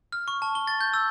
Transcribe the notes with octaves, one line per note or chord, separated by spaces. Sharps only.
F6
C#6
A5
G7
A6
G6
E6